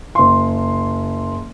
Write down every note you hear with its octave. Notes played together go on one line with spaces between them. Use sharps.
F#1 C6